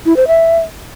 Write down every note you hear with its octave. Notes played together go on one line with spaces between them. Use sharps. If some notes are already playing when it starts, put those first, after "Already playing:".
E4
C5
E5